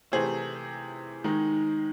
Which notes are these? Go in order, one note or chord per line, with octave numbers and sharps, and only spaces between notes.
C3 E3 A3 G#4 C5
D#3 G#3 D#4